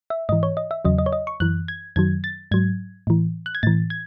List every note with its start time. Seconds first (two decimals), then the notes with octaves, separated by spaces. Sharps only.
0.10 E5
0.29 G#2 E3 D#5
0.43 C#5
0.57 D#5
0.71 E5
0.85 E2 C#3 F#3 D#5
0.98 D#5
1.06 C#5
1.13 D#5
1.27 C#6
1.40 F#2 E3 F#6
1.68 G#6
1.96 F#2 D#3 F#3 G#6
2.24 A6
2.51 G#2 F#3 G#6
3.07 A2 E3
3.46 F#6
3.55 G#6
3.63 A2 E3 A6
3.90 G#6